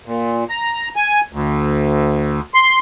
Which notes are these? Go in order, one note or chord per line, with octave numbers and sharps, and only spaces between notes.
A#2
A#5
G#5
D2
C6